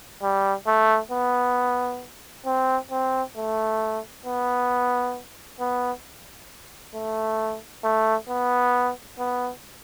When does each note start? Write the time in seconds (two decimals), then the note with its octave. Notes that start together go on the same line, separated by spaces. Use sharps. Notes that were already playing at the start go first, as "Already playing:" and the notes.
0.22 G3
0.67 A3
1.11 B3
2.46 C4
2.91 C4
3.36 A3
4.26 B3
5.60 B3
6.95 A3
7.84 A3
8.29 B3
9.19 B3